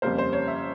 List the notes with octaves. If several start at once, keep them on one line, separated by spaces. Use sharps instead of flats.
F2 C#3 G3 A#3 C5
C5
C#5
E5